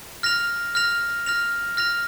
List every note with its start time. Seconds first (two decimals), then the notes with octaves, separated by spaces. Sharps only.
0.23 F6 A#6 F7
0.75 F6 A#6 F7
1.26 F6 A#6 F7
1.77 F6 A#6 F7